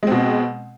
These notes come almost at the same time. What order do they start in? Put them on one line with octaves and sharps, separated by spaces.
G#3 C4 B2